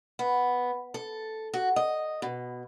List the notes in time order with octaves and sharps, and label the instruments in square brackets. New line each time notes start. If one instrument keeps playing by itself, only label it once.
[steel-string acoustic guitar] B3
A4
F#4
D#5
B2